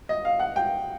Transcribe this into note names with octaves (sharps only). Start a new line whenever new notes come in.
D#5
F5
F#5
G5